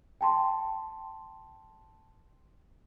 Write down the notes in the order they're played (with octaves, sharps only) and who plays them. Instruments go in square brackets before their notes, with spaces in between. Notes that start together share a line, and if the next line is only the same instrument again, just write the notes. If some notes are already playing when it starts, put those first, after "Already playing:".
[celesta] G5 A5 C6